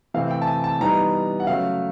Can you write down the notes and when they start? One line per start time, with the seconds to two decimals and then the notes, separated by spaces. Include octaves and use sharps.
0.14 C3 E3 A3 C4 F5
0.31 G5
0.42 A5
0.47 G#5
0.64 A5
0.80 E3 G3 B3 D#4 A#5
1.40 F#5
1.47 C#3 F#3 A3 F5